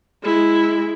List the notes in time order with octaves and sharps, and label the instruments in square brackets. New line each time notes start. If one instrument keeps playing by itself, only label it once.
[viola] G#3 E4